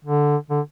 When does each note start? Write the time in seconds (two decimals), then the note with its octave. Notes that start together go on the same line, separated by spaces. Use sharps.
0.05 D3
0.50 D3